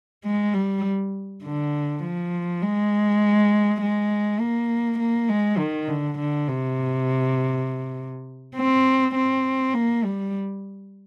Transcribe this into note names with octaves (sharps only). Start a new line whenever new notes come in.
G#3
G3
D3
F3
G#3
G#3
A#3
A#3
G#3
D#3
D3
D3
C3
C4
C4
A#3
G3